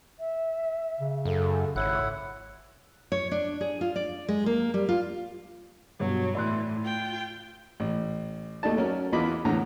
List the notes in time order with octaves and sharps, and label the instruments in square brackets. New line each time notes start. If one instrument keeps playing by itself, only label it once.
[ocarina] E5
[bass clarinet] C#3
[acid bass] F#2 [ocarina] A4
[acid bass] G#1 [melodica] E4 F#5 [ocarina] C#5
[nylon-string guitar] C#5
D4
G#4
F4
D5
G#3
A#3
G3
F4
[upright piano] G2 B2 C#5 [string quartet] F#3
[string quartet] A2 E3 [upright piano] D5 C6 F#6
[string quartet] F4 G5
[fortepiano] A1
D#2 A3 D#4 D5 A5
F#3 C#4 A#4
E2 E3 F4 D#5 B5 D6
E2 A2 D3 E3 A#5